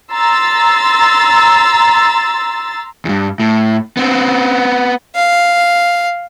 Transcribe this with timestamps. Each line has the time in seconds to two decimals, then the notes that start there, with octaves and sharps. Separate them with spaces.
0.12 A#5 C6 E6 A6
3.05 E2 G2
3.40 A2
3.97 B3 C4
5.15 F5